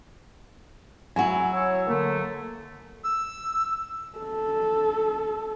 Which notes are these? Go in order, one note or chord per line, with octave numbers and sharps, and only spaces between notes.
F#3 E4 F#4 G#5
C#5 E6
D3 F#3 A3 A#3
E6
A4